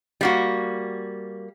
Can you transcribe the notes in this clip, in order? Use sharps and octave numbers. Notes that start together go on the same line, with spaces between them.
G3 A#3 F#4